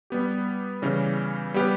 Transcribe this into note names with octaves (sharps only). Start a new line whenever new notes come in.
G3 B3 G4
C#3 E3 G3 C#4
G3 B3 G4 B4